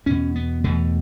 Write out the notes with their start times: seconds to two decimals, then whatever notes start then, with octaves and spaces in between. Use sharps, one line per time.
0.06 E2 B2 C#4
0.36 B3
0.64 E2 B2 A3